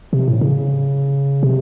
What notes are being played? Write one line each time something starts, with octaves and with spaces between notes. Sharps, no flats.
C3
A2
C#3
C3